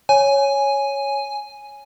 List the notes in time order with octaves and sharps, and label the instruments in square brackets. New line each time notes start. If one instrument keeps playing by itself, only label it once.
[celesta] C#5 [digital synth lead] G#5